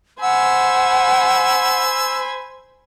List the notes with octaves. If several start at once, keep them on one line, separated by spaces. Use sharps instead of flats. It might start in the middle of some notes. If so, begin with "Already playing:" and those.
C5 F#5 G#5 B5 E6